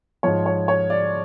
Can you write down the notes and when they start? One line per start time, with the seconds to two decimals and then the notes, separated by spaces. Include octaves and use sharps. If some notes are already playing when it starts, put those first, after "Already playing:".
0.23 G#2 F3 C#5
0.46 C#5
0.68 C#5
0.90 D5